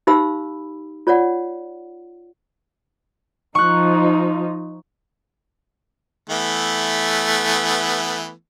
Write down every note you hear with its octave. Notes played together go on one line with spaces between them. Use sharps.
D#4 G4 C5 F5 B5 E6
F4 C#5 D5 F#5
F3 D#4 C#6 F#6
E3 A3 B3